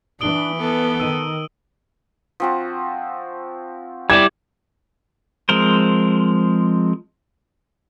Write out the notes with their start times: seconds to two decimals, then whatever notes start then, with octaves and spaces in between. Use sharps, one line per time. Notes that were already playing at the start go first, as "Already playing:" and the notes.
0.21 E3 D4 D#6 D7 G7
0.56 B3 A4
1.00 D#3 E6 D#7
2.40 F3 C4 F#4
4.10 G3 E4 G4 D5 G#6
5.49 F3 G#3 C4 A#4 C5